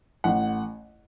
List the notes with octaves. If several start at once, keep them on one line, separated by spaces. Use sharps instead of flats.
A1 F#5